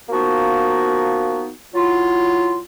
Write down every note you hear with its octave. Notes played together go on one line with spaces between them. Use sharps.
F3 A#3 B3 D#4 F#4
F#3 E4 F4